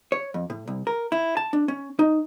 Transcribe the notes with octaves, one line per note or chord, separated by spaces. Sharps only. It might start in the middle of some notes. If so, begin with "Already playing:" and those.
C#5
F2
A2
C2
A#4
E4
A5
D4
C#4
D#4